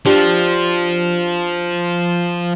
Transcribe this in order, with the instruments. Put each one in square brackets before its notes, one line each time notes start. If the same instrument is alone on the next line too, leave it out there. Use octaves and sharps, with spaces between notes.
[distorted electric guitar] F3 [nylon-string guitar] D4 G4 C5